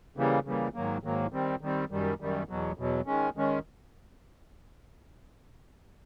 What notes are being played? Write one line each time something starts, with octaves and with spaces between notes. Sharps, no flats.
C#3 E3 G3 A#3
C#3 E3 G3 A#3
G#2 D#3 F#3 A#3
G#2 D#3 F#3 A#3
D#3 G3 C4
D#3 G3 C4
F#2 D#3 G3
F#2 D#3 G3
E2 B2 F#3
E2 B2 F#3
D#3 G#3 C#4
D#3 G#3 C#4